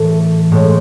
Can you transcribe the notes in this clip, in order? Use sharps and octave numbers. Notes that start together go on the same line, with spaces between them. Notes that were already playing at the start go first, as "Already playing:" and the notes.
Already playing: A2 E3 A3 A4
A2 G#3